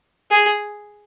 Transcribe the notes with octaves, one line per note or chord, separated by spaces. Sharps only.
G#4